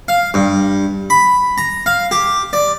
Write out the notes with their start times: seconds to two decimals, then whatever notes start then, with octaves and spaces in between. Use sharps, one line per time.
0.08 F5
0.34 G2
1.10 B5
1.58 A#5
1.86 F5
2.11 G4
2.53 D5